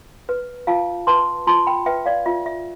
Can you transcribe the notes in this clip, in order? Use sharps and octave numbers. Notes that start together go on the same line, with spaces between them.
B4
F4 F5 A5
B4 A5 C6
F4 A5 C6
G5 B5
B4 E5 G5
D5 F5
F4 E5
E5